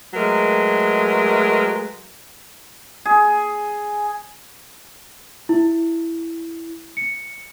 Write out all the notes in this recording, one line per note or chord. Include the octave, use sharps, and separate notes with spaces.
F#3 G#3 A3 A#4 B4
G#4
E4
C#7